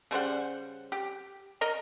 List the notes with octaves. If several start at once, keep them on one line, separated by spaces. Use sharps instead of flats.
C#3 G3 C5 F#5
G4
A#4 D#5 A#5